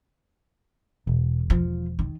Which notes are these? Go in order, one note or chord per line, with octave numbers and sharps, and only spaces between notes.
E1 B2
F3
D#3